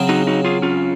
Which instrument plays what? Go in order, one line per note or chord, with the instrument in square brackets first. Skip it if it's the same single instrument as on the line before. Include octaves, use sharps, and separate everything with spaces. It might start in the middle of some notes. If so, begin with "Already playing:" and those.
Already playing: [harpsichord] C#3 F#3 C4
[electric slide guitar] D#4 F#4
D#4 F#4
F4 G#4
C#4 F4